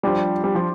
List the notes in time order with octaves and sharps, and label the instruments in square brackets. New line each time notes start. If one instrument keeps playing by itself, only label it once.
[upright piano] F3 D4 G4 C5 [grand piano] G3
[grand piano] G3
F3